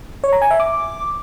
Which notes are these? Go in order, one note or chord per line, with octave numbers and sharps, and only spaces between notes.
C#5
A#5
G#5
E5
D6